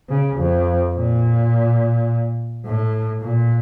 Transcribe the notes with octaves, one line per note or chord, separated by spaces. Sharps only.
C#3
F2
A#2
A2
A#2